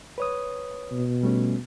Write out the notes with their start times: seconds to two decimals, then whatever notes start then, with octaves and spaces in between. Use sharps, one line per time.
0.18 B4 C#5 D#6
0.92 B2
1.23 G3 A3 C#4